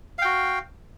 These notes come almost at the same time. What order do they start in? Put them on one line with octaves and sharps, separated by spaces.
F5 G5 F#4